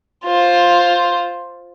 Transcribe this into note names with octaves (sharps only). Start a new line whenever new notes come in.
F4 C5